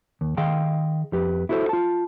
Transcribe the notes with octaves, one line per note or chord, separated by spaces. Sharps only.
D#2
D#3 G#4 D#5 F5 G5 C6
F2 G4 B4
E4 F#4 A4 A#4 C5
F4 A5